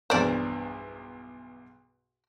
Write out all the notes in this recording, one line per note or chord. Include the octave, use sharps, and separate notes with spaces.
B1 E2 G2 C5 D5